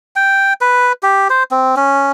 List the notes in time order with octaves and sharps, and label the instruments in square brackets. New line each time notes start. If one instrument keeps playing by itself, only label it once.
[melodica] G5
B4
G4
C5
C4
C#4